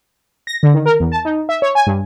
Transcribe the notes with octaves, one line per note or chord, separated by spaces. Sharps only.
A#6
D3
D#3
A#4
E2
A5
D#4
E5
C#5
G#5
G2